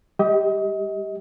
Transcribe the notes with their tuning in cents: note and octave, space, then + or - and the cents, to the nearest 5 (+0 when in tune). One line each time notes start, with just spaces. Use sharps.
G3 +45 G4 +0 D#5 +30